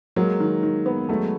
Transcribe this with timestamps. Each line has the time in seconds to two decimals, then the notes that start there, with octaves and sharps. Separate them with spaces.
0.16 F#3 G#3 A#3
0.40 D#3
0.63 D#3
0.86 B3
1.09 F#3 G#3 A3